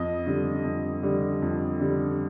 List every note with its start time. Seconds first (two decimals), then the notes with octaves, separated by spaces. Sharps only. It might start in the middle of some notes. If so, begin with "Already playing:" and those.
Already playing: F2 D#5
0.26 D3 G3
0.65 F2
1.03 D3 G3
1.42 F2
1.80 D3 G3